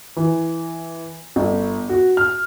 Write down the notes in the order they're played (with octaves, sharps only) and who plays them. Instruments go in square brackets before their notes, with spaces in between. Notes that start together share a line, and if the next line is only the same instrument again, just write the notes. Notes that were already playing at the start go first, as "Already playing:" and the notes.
[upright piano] E3
G1
F#4
F6